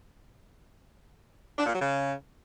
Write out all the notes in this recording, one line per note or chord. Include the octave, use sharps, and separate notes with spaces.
D4
A#2
F#3
C#3